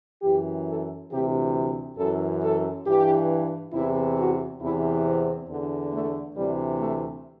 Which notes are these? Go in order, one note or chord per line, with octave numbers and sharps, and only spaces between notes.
F#2 E3 G4
A4
D2 C3 E3 G4
F#2 E3 A4
A4
G2 E3 G4
E2 C3 E3 E4
F#4
E2 C3 E3 E4
C4
E2 D3
A3
D2 C3 E3 G3
A3